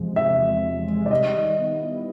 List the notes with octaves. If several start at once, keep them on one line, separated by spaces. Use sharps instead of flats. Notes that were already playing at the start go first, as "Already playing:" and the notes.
Already playing: E2 C3 F3 G#3
C3 E5
E2
F3
G#3
D5
G3 D#5
D#3
B3
E4